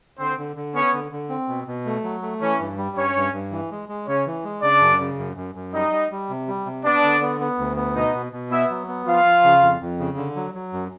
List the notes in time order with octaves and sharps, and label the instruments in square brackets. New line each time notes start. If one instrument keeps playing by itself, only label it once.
[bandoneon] D3 [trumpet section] C4 C5
[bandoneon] D3
D3
[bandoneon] B3 [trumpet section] C#4 C#5
[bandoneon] D3
D3
C4
B2
B2
A3
F#3
A3
[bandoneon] E3 [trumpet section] C#4 C#5
[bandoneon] G2
G3
[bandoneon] G2 [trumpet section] C#4 C#5
[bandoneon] G2
G2
E3
G#3
G#3
[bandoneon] C#3 [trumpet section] C#4 C#5
[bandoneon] E3
G#3
[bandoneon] C#3 [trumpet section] D4 D5
[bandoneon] F#2
C#3
F#2
F#2
F#2
[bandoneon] G3 [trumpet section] D#4 D#5
[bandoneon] G3
G3
C3
G3
C3
[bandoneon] B3 [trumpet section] D4 D5
[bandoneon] D3
B3
B3
D2
B3
[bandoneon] B2 [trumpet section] D#4 D#5
[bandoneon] B2
B2
[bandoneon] B3 [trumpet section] E4 E5
[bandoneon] F#3
B3
[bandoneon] F3 [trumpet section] F4 F5
[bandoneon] F3
C#3
F2
F2
C#3
D3
F#3
F#3
F#2